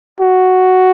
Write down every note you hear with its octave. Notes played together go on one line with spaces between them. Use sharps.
F#4